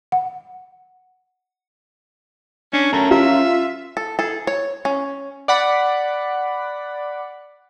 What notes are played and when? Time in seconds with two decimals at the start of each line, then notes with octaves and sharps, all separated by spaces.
0.12 F#5
2.73 C#4 D4
2.93 A3 C#4 A#4 A#5
3.11 F4 E5
3.97 A4
4.19 G#4 A4
4.47 C#5
4.85 C#4
5.48 D5 F#5 B5